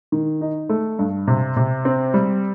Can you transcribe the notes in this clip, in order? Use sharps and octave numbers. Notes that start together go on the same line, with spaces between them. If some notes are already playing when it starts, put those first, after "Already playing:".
D#3
D#4
A3
G2
C3
C3
C4
G3